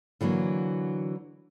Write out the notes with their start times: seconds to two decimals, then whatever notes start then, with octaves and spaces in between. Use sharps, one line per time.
0.21 D3 E3 F#3 A#3